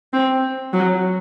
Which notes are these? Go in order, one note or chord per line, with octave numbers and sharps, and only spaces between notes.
C4
F#3